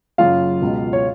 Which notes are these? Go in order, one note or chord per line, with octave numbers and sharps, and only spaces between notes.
F#1 F#2 C#3 F4 F5
C#2 B2
C#5